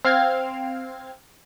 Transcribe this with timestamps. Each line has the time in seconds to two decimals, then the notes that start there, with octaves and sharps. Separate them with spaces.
0.05 C4 F5 F6 G#6